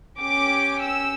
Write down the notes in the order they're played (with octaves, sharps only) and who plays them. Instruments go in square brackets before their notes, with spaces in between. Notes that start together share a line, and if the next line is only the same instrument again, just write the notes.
[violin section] C#4 G4 D6
E6